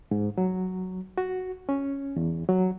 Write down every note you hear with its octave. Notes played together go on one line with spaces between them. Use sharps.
G#2
F#3
F#4
C#4
E2
F#3